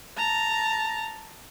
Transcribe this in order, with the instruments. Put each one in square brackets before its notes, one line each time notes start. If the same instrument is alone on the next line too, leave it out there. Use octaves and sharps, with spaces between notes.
[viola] A5 A#5